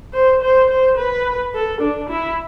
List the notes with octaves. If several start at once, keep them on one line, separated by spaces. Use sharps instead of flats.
C5
C5
C5
B4
A4
D4
E4